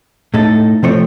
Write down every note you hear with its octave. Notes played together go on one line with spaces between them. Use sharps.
A2 A3 D#4 A4
C3 F3 A3 C4 C#5